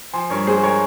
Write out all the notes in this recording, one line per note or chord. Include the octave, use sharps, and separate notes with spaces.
F3 G#5 C6
G2 A#4 C#5
G#3 G#4 C5
A#4 C#5